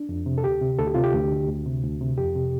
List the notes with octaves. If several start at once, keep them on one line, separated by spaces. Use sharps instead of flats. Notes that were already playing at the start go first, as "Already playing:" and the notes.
Already playing: D4
F2
C3
A4
D2 G4
C3
D2 A4
G4
C3 F4
G4
D2
D3
D2
C3
D2
C3
F2 G4
C3